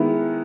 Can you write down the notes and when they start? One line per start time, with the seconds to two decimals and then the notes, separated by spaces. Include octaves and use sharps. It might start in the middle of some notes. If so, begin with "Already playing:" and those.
Already playing: D#3 G#3 B3 E4